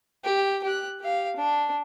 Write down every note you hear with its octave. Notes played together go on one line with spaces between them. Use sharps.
G4
G4 F#6
G4 F5
D4